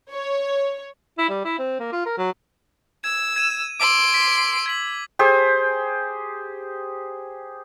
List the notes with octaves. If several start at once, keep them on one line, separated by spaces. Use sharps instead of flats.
C#5
E4
G3
E4
C4
A#3
F4
A#4
F#3
E6 G#6
G#6 D#7 E7
C6 D6 E6 D7 F#7
B6
G#6 B6 F#7
G4 G#4 C5